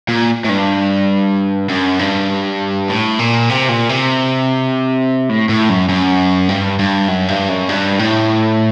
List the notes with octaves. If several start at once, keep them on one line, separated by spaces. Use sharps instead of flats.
A#2
A2
G2
F#2
G2
A2
A#2
C3
A#2
C3
A2
A2
F#2
F#2
G2
G2
F#2
G2
F#2
G2
A2